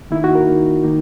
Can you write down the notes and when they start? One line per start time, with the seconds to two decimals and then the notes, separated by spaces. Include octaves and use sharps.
0.11 D#3 A#3 D#4 E4
0.24 F#4
0.35 A#4
0.47 D#3 A#3 D#4
0.83 D#3 A#3 D#4